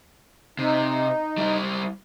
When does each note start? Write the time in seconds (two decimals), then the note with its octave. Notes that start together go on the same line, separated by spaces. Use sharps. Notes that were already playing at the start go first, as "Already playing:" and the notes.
0.59 C3 D#4
1.38 G3 E4